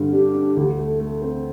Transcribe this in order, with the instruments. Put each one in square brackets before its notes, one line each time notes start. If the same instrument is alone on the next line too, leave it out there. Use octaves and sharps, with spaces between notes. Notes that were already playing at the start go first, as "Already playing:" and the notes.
Already playing: [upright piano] G2 D3 G3
[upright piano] D4 [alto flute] G4
[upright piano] D4
D2
A3
A3
C4